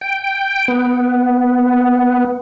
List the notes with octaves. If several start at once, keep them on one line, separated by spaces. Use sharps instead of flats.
G5
B3